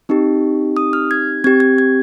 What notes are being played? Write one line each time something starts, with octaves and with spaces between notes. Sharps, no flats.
C4 D#4 G4
D#6
F6
G#6
C4 G4 G#6
G#6
G#6